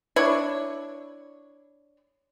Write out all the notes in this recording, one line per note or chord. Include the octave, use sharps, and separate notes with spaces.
D4 E4 C#5